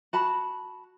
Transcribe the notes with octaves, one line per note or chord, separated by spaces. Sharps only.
F#4 A5 B5